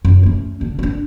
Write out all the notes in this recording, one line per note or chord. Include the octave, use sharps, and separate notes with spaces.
F#2
A3 C#4
D3 D4
C#4 D4